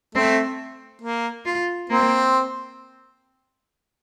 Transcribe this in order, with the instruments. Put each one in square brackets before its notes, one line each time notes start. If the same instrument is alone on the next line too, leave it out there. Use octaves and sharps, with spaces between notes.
[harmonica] A3 [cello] C4
[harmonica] A#3
[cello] F4
[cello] A#3 [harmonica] C4